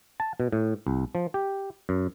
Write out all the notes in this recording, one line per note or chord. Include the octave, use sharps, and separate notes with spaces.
A5
B2
A2
C2
F3
G4
F#2